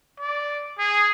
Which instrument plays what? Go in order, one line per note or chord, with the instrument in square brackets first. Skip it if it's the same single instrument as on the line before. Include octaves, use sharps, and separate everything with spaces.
[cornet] D5
G#4